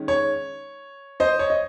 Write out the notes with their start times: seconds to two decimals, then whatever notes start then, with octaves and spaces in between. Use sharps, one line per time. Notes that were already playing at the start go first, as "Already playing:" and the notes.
Already playing: D#3 G#3 C#4
0.08 C#5
1.20 C5 D#5
1.39 C#5
1.50 D#5